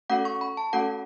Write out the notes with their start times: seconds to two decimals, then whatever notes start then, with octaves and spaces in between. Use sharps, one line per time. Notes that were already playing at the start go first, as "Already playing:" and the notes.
0.10 A3 C#4 F#4 A4 F#5
0.25 C#6
0.41 B5
0.57 A5
0.73 A3 C#4 F#4 A4 F#5